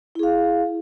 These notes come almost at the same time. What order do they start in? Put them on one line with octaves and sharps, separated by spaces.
E4 G#4 F5